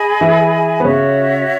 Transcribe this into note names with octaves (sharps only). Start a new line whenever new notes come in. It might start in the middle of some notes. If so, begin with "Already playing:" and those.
Already playing: G#4 D#5 G#5 B5
E3 E4
B3
C#3 C#4 F#4 C#5 E5